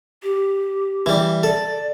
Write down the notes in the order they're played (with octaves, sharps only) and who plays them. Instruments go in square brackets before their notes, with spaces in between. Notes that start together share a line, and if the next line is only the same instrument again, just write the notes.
[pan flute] G4
[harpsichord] E3 G3
[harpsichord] A4 [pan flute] D5